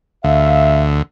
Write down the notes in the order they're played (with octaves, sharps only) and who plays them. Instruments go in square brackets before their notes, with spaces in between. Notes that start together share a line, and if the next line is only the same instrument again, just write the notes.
[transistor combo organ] D2 [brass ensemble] E5 F5